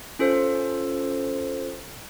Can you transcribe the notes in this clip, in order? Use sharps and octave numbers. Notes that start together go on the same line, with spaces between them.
C#4 F4 A4 C5